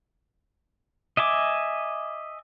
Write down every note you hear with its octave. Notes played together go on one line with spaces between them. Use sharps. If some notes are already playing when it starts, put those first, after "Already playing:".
D#5 E5 G#5 D6